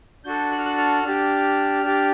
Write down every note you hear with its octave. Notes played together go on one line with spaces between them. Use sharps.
D4 F#4 A4 G6
F#6
F6
F#6
F6
D4 G4
D4 G4